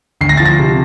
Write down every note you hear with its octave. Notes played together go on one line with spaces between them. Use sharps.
D2 C7
A#6
F3 A6
A#6
C3